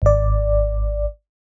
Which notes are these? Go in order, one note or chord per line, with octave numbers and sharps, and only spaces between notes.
G#1 D5